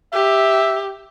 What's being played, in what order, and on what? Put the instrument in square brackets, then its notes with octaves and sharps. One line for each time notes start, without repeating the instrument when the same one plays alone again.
[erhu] G4 [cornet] E5